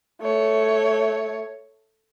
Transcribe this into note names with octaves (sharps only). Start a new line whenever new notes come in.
A3 C#5